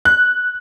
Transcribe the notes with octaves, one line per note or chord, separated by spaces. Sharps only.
F#6